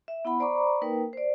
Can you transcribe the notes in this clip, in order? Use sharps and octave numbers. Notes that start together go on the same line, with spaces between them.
E5
B3 E4 F#5 B5
C5 D5 A#5 B5 C#6 D6
A#3 D#4 A#4 B4 G5
C5 D5